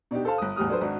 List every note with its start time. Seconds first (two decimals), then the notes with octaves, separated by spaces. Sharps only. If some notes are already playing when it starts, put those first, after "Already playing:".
0.11 B2 D4 D#4 G4
0.25 A4 C5 F5 A5
0.38 G1 D#6
0.56 G1 E2 A2 G3 D#6 F6
0.69 F#3 D4 A4 B4 C5
0.81 G#1 D4 F#4